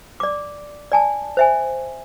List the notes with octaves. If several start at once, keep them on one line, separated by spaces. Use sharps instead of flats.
D5 D6
D5 G#5 A5
C5 E5 G#5